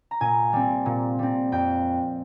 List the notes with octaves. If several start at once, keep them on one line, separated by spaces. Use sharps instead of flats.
A#5
A#2 G#5
G3 C4
A#2
G3 C4
F2 G5